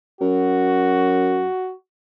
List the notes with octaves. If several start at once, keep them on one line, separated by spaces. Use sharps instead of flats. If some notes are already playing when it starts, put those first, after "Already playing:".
F#2 F#4